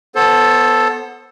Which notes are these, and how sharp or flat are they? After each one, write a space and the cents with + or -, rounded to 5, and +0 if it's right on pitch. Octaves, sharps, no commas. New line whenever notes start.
B3 +0 A4 +0 C5 +30